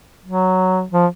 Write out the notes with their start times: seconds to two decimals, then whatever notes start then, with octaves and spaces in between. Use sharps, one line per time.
0.25 F#3
0.92 F3